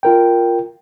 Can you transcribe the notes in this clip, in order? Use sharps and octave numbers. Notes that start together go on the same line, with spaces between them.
F4 A#4 G5